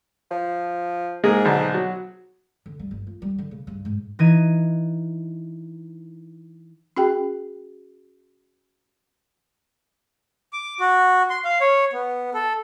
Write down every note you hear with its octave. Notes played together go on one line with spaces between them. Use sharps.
F3
G#2 G#3 A#3 G#4
B1 D3
F#3
D3
G3
G1
F4
G3
D3
C#3
G2
G#2
E3 D#4 G#6 D#7
C#4 F#4 G#4 G5
D6
F#4
C6
F5
C#5
B3
A4